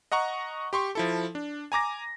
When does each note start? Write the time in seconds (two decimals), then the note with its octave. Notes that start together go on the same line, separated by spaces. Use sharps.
0.12 D#5 F#5 A#5 C#6
0.73 G4 C6 C#6
0.95 F3 E4 A4
1.35 D4
1.72 G#5 A#5 D6 A#6